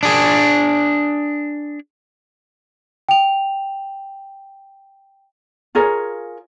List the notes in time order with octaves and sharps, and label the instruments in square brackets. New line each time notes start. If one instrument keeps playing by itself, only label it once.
[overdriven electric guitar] D4 G#4
[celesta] G5 F7
[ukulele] F4 G#4 A#4 C#5